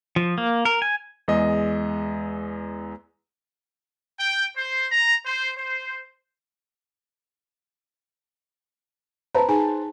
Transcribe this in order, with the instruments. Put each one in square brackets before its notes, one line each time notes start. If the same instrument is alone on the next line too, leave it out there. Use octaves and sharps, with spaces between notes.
[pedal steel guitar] F3
A#3
A#4
G#5
[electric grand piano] E2 G#3 D#5
[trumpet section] G5
C5
A#5
C5
C5
[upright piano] B4 C5 A5 [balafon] A#5
[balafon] D#4 G#4 G#5